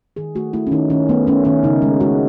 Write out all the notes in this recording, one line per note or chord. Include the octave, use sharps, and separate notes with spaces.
D#3 G#4
A3 F#4
A3 E4
C#4
D#3 D#4
D#3 C#4
A3 B3
A3 C#4
D#3 C#4
C#3 D#4
G#3
G#3 F#4